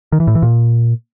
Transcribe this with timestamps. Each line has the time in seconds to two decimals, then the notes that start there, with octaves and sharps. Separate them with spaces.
0.12 D#3
0.20 E3
0.27 A2
0.35 E3
0.42 A#2